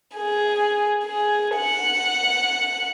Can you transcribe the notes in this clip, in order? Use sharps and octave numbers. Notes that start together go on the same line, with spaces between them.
G#4
G#4
F#5